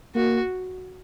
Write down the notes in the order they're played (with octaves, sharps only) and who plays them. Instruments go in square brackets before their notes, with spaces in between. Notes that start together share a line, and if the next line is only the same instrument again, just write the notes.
[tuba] A#3 [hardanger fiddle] F#4